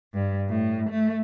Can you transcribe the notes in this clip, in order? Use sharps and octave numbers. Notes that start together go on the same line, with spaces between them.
G2
A2
A3